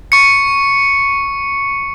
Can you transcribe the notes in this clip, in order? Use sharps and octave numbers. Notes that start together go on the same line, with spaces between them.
C#6 C#7